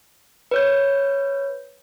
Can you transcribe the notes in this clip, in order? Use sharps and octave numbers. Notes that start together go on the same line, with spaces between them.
B4 C#5 G6